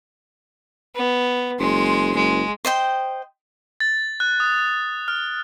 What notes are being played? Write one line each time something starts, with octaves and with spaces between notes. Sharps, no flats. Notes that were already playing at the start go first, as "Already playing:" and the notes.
B3
F#1 G#3 C6
F#1 G#3
C5 D#5 G5
A6
F#6
D#6
F6